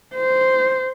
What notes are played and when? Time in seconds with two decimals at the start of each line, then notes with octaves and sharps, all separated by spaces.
0.15 C5